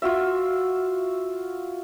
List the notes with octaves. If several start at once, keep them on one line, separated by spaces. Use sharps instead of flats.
F4 F#4 E5